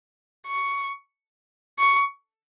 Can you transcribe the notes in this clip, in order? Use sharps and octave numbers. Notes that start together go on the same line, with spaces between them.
C#6
C#6